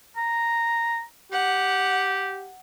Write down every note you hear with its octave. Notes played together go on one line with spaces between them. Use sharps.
A#5
G4 F#5